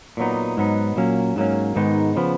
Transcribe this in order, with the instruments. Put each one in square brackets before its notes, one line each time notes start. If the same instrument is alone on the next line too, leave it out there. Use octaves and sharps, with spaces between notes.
[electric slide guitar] A#2 F#3 B3 D#4
G#2 F#3 B3 D#4
A#2 F#3 A#3 C#4
G#2 F#3 A#3 C#4
G#2 D#3 G#3 B3 D#4
C#3 F3 B3